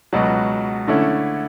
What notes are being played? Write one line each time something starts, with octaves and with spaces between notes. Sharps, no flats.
C#2 B2 F#3
D3 A3 C#4 E4